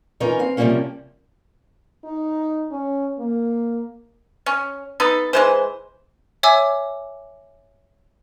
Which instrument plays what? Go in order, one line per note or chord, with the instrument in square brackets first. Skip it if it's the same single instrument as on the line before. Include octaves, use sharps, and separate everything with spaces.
[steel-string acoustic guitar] E3 C#4 D#4 F4 A#4 C#5
C4 F5
C3 F3 G3 A3 A#3 C#4
[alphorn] D#4
C#4
A#3
[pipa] C#4
B3 D#4 A4
E3 G#3 C5
[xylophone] C#5 E5 G#5 D6 E6